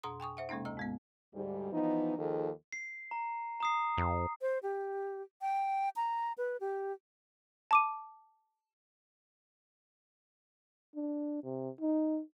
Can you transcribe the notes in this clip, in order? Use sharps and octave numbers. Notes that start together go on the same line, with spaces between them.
F2 B2 A#5 C6 D#6
G5 G#5 C#6 D#6
C5 E5 F#5
C3 G#3 A#3 C#4 D#4
D2 A#5 E6
G#2 G#3 B3
D2 G#2 G3
E3 F3 B3 D#4
D#2 D#3 F3 G#4 A4
C7
A#5
A#5 D#6 C7
F2
C5
G4
G5
A#5
B4
G4
A5 D6 D#7
D4
C3
D#4